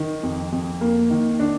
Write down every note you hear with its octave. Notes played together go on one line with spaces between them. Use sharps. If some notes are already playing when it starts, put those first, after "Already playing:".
Already playing: D#3
F2
F2
A#3
D#3
D4